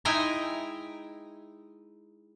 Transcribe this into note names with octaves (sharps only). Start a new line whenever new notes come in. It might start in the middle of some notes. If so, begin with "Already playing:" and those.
G#3 D#4 E4 G5 G#5 A#5